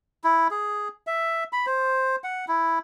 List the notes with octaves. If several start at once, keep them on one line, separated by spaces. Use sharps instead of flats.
E4
G#4
E5
B5
C5
F#5
E4